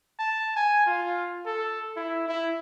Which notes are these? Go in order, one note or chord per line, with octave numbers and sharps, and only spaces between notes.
A5
G#5
F4
A4
E4
E4